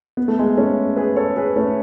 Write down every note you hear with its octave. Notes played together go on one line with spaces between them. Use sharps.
B3
A3
G#3 B3
A3 C#4
G#4 B4
A4 C#5
G#4 B4
A3 C#4